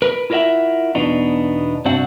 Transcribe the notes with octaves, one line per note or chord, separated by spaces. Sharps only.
A#4 B4
E4 F4 A#4 C#5 E5 F#5
E2 B2 B3 D4 D#4
C2 G2 C4 D4 F#4 F#5